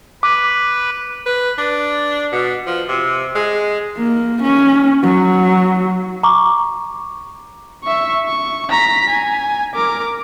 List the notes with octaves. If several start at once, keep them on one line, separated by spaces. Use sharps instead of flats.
B4 D6
B4
D4
B2
F3
C3
G#3
A#3
C#4
F#3
A#5 C#6 D6
E5 C#6
C#6
A#5 B6
G#5
A#4 D6